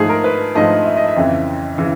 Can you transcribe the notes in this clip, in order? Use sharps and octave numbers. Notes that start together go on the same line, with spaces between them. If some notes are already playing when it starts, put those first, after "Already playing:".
Already playing: G#2 F3 A3 G#4
A#4
B4
G#2 F3 A3 D#5
E5
D#5
E5
F2 C#3 E3
C#3 E3